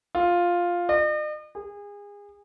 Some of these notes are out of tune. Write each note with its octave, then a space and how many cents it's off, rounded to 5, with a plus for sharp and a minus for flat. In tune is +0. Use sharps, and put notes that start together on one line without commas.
F4 +5
D#5 -45
G#4 -30